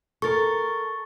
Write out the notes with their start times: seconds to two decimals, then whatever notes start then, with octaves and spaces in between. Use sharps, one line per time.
0.22 A4 A#4 C#6 A6